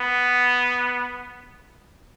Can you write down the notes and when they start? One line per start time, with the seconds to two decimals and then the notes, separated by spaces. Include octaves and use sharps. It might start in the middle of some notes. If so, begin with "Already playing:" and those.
Already playing: B3